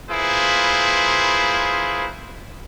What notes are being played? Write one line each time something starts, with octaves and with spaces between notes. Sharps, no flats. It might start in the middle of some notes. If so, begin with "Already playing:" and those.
A#3 E4 F4 G#4 B4 C5